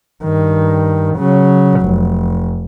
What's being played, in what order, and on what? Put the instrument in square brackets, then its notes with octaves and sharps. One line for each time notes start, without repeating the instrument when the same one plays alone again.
[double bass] G2 D#3
C#3 F#3
F1